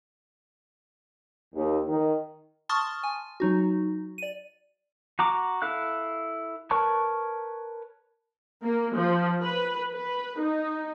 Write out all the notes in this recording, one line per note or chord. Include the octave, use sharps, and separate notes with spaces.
D#2
D#3
A5 C6 C#6 D#6 F6 A6
G#5
F#3 D#4 F#4
D5 D#7
F#4 A#5 D6
E4 A4 F5 F#6
A#4 B4 C#5 A5 C#6
A#3
F3
B4
B4
D#4